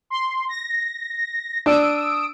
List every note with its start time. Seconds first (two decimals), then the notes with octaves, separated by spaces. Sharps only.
0.10 C6
0.49 A#6
1.66 D4 D#6 E6 D7